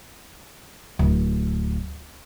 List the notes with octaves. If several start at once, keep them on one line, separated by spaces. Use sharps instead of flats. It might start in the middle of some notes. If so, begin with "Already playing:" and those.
D1